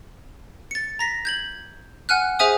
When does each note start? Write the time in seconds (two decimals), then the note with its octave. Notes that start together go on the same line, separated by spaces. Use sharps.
0.71 A6 C#7
0.99 A#5 A#6 B6
1.25 G6 G#6 F#7
2.09 F#5 G#5 F6 F#6
2.39 G#4 C5 E5 G#5 D#6